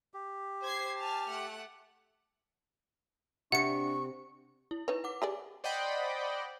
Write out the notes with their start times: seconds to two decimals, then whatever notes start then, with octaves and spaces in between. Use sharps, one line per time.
0.14 G4
0.63 C5 G#6 C7
0.99 G#5 A5 F6
1.30 A3 F#5
3.52 C3 D4 F#5 C#6 C#7
4.71 E4
4.88 D#4 B4 C#5
5.04 F#5 D6
5.22 G4 G#4 D5
5.64 C5 D5 D#5 F#5 G5 B5